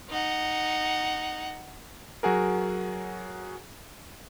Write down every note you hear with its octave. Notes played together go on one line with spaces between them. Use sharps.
D#4 F#5
F#3 F#4 G#4 A#4